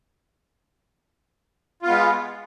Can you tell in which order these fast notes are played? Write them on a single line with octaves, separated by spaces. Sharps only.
F4 B3 G#3